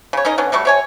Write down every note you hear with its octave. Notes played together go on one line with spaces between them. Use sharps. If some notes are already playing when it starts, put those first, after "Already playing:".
C#3 C#5
C#4 D#4 A#4 D#5
D3 B3 C#4
F#3 G3 A3 C#6
C3 C#5 G#5